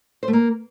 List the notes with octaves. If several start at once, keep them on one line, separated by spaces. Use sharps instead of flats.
C5
A3
A#3